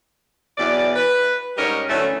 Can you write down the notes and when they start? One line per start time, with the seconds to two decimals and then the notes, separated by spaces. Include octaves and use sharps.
0.58 E2 B2 F#3 D5
0.96 B4
1.58 G#2 G3 C#4 A#4 C#5 D#5
1.89 D3 E3 F#3 A3 C#4